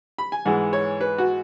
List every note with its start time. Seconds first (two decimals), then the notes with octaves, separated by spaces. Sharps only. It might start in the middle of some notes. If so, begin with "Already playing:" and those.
0.18 B5
0.32 G#5
0.45 G#2 E3 G#3 F#5
0.73 C#5
1.01 B4
1.18 F#4